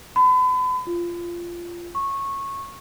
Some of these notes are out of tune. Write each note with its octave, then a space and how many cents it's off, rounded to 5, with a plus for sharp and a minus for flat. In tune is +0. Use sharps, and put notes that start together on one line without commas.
B5 +40
F4 -15
C#6 -15